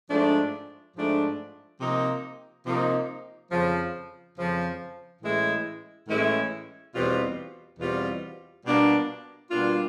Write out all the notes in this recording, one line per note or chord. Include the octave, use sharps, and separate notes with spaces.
G#2 F3 A3 D4
G#2 F3 A3 D4
C3 F3 A#3 D#4
C3 F3 A#3 D#4
F2 C#3 F3
F2 C#3 F3
A2 E3 G#3 C#4 E4
A2 E3 G#3 C#4 E4
E2 B2 G3 C4 F4
E2 B2 G3 C4 F4
B2 G3 A#3 D4 F4
B2 G3 A#3 D4 F4